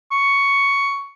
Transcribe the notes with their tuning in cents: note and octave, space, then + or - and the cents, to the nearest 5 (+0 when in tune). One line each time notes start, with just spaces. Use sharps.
C#6 +10